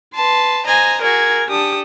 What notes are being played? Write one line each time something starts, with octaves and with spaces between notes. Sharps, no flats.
B4 A5 C6
C5 D#5 G#5 A#5
F#4 G#4 A#4 G#6
D4 G4 A4 D#6